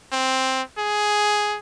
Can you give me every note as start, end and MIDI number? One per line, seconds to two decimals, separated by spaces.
0.12 0.62 60
0.78 1.58 68